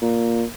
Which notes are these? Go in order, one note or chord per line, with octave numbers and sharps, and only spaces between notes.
A#2